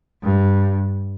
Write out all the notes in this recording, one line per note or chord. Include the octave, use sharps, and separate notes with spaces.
G2